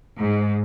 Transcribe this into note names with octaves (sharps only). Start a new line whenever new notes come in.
G#2